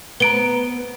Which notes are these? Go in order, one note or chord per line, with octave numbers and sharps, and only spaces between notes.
B3 A#5 D7 G7